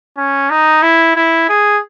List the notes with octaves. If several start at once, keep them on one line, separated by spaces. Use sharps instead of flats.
C#4
D#4
E4
E4
G#4